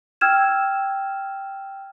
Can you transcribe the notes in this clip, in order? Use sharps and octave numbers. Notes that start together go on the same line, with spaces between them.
G5 E6 F6 G#6 E7